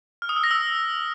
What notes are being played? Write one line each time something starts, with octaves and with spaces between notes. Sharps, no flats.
F6
D#6
E6
A#6
E6